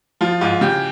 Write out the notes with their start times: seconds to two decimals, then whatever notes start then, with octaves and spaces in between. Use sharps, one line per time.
0.21 F3 F4
0.41 G#2 F4
0.61 C#3 G4